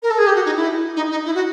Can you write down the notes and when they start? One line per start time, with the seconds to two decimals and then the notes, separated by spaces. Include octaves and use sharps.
0.02 A#4
0.10 A4
0.18 G#4
0.27 G4
0.35 F#4
0.45 D#4
0.56 E4
0.96 D#4
1.11 D#4
1.25 E4
1.34 F#4